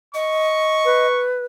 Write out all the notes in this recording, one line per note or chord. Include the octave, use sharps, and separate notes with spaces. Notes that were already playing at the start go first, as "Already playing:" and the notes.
D#5 C#6
B4